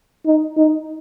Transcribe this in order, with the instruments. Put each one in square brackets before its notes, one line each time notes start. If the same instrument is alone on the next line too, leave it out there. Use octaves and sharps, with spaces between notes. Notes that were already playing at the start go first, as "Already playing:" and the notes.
[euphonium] D#4
D#4